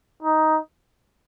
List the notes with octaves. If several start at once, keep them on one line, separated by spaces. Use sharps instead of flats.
D#4